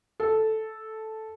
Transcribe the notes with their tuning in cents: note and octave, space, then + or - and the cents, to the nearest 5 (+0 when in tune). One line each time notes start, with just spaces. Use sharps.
A4 -5